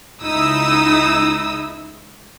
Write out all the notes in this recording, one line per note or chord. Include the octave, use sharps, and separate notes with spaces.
C#2 D#4 E4 D#6 E6